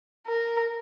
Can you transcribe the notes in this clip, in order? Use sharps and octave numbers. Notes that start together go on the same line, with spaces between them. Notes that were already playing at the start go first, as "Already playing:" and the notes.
A#4